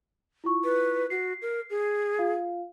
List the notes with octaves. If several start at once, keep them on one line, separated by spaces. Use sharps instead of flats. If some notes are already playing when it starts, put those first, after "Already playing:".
E4 F4 C#6
B4
F#4 C7
A#4
G#4
F4 F5